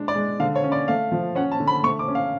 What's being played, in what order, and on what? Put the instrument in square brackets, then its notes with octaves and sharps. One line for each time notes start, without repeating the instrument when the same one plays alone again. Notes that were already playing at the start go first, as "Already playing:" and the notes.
Already playing: [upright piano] G#3 D4
D5
G#3
D3 F5
C#5
C#4
D5
A3 F5
F3
C#4 F#5
A5
D3
B5
A3 C#6
D6
C#4
F5